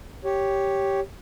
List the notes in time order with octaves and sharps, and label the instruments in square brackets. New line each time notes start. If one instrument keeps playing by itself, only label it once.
[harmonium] G4 C#5